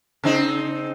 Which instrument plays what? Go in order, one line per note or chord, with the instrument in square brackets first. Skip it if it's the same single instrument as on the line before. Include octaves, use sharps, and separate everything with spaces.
[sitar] C#3 C4 D#4